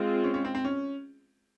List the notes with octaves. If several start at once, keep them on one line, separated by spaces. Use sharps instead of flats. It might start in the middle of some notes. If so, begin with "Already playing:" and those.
Already playing: G#3 C4 F4
C#4
C#4
C4
C4
C#4